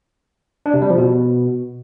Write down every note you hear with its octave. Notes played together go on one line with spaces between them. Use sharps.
D4
C3
G3
F3
B2